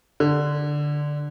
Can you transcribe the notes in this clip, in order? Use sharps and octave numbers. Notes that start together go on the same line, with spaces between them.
D3